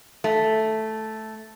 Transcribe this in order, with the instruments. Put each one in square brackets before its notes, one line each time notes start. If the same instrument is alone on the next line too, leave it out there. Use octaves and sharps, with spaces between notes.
[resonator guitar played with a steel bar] A3